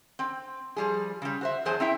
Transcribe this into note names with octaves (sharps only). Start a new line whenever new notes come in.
C4 G5
F3 G3 G#4
C#3 G3
F#4 C5 E5
E2 F#3 G#4 C5 G#5 A5
C4 E4 E5 G5